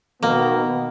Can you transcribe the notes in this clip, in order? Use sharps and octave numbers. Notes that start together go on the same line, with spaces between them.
B2 D#3 A#3 B3